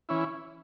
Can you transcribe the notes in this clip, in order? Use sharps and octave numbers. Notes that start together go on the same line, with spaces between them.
E3 C#4 E4